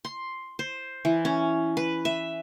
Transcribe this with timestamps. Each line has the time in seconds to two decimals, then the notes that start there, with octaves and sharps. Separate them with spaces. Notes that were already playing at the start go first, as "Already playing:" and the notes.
0.05 C6
0.59 C5
1.05 E3
1.25 C#4
1.77 B4
2.05 E5